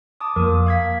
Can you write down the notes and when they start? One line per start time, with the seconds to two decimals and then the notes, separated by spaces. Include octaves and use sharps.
0.21 A5 D6 D#6
0.36 F2 A#3 A#4
0.66 F5 G#6 B6